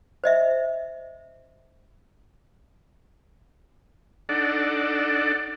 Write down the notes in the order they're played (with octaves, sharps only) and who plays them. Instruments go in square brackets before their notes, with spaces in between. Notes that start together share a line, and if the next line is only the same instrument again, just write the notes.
[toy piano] C5 D#5 E5
[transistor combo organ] D4 D#4 A4 D5 F#5